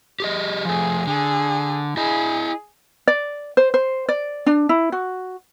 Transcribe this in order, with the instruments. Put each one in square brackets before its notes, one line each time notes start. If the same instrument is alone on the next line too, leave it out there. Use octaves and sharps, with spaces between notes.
[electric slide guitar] G4 G#4 D#5
[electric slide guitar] F3 A3 [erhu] G#4
[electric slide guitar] D3 [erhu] G#4
[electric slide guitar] E4 D#5 [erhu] G#4
[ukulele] D5
C5
C5
D5
D4
E4
F#4